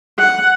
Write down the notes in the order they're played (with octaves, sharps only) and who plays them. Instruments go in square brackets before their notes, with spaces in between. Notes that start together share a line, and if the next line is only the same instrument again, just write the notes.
[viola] F#5